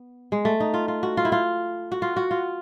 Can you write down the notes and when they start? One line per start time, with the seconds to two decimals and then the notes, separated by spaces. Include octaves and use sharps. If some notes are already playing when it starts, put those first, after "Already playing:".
Already playing: B3
0.32 G#3
0.45 A3
0.60 D#4
0.74 F4
0.88 F4
1.03 F#4
1.17 F4
1.25 E4
1.32 F4
1.92 F#4
2.02 F4
2.16 F#4
2.31 F4